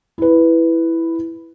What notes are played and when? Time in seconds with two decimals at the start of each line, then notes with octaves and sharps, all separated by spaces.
0.18 E4 B4